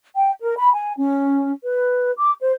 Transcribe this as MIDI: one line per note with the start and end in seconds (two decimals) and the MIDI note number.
0.16 0.31 79
0.41 0.52 70
0.57 0.70 83
0.74 0.92 80
0.97 1.52 61
1.63 2.11 71
2.17 2.31 86
2.41 2.51 72